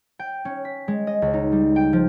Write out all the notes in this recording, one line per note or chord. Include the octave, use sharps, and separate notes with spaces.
G5
C#4
B6
G#3
D#5
C#2
D#4
G3
G5
F3